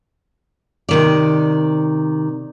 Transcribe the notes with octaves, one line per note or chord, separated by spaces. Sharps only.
C3 D#3 D5